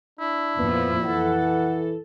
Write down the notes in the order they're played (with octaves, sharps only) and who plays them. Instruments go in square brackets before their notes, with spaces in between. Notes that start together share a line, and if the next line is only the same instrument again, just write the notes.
[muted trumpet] D4 [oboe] E4
[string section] F2 A#2 F3 [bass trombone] B3
[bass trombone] E3 [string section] A4 [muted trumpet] F#5